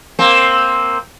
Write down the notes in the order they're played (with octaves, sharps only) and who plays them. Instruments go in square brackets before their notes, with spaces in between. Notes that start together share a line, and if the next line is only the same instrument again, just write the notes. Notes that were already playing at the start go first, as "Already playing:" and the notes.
[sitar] A#3 C4